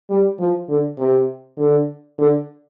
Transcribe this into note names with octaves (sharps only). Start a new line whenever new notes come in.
G3
F3
D3
C3
D3
D3